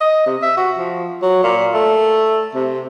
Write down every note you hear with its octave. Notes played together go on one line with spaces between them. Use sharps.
D#5
C3
E5
F#4
F3
F#3
A#2
A3
C3